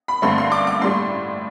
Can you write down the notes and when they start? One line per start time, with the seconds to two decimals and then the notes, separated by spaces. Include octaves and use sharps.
0.08 B5
0.22 G2 D3 A3 C4 C6
0.38 C6
0.52 D6
0.67 D6
0.82 A2 G3 D4 C6